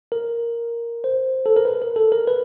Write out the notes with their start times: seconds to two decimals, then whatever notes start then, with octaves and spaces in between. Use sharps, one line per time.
0.12 A#4
1.04 C5
1.46 A4
1.56 A#4
1.65 B4
1.82 A#4
1.96 A4
2.12 A#4
2.27 B4